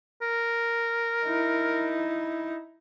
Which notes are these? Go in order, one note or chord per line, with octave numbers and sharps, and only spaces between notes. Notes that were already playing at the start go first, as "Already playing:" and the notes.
A#4
D#4 E4